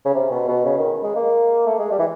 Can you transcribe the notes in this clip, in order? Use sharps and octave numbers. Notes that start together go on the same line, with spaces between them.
C#3
C3
B2
B2
C#3
D#3
G#3
A#3
A3
G#3
G3
E3